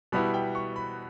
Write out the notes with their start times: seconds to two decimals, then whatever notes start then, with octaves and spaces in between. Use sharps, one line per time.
0.12 B2 G3 B3 E4 B5
0.34 G5
0.55 C#6
0.76 B5